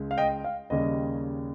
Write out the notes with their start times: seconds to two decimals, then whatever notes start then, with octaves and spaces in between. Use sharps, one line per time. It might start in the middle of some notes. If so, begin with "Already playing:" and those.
Already playing: C#2 C#3 G#3
0.11 F5
0.17 D#5 G5
0.44 F5
0.70 D#2 C#3 G3 D#5